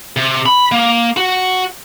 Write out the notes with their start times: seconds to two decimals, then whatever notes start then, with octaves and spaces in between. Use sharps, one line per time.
0.17 C3
0.46 B5
0.72 A#3
1.17 F#4